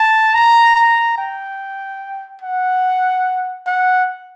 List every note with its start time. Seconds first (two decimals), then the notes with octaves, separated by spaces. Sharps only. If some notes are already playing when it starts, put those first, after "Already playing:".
Already playing: A5
0.34 A#5
0.76 A#5
1.18 G5
2.41 F#5
3.66 F#5